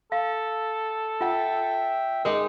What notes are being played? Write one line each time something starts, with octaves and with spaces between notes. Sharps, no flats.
A4 F5
F4 E5 F#5 G5
G#3 D#4 G#4 A#4